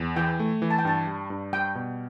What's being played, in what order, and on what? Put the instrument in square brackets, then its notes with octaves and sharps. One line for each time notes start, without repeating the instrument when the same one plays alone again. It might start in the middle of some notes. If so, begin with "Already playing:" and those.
Already playing: [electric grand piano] E2
[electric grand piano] E3 [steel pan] G5
[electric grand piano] A3
E3
[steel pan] A5
G5
[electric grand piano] G2 [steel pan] A5
[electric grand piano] G3
G2
[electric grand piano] G3 [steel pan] G5
[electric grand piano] B2